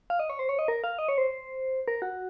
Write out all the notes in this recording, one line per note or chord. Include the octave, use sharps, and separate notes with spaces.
F5
D#5
C#5
C5
C#5
D#5
A#4
F5
D#5
C#5
C5
A#4
F#4